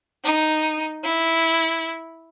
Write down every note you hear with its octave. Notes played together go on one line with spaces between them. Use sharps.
D#4
E4